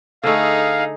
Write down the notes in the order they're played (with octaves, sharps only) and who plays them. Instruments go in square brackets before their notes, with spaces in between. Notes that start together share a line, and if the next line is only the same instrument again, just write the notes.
[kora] D3 A3 [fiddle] D#4 G#4 [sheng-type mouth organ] F5